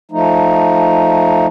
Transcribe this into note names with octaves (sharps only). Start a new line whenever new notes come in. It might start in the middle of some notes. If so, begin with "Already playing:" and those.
F3 A3 D#4